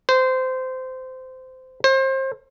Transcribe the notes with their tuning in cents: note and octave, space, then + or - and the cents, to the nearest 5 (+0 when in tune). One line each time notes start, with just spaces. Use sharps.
C5 -20
C5 +30